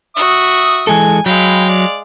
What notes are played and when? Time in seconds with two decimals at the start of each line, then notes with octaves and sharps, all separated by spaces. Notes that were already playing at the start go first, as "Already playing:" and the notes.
0.16 F#4 E5 D#6
0.87 E3 G#3 A4 G#5
1.26 F#3 G#3 F5 G5 B5
1.69 D5